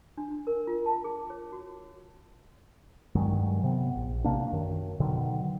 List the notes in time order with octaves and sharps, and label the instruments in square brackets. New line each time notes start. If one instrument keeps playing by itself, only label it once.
[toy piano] D4
D4
A#4
F4
A5
G#4
C#5
F#4
[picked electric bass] G2 D#3 F#3 G#3
C3 B3
A#1
C3 A#3 D4
F#2 D#3
B2 D3 D#3 F#3